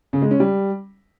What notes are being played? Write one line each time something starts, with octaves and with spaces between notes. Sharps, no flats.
C#3
G#3
C#4
G3